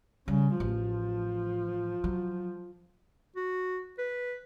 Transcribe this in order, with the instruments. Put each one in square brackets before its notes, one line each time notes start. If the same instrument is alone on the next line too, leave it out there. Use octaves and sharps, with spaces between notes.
[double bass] C#3 [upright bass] G3
[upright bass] A1 [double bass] F3
[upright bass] F#3
[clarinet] F#4
B4